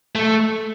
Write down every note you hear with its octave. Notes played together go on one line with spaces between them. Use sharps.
A3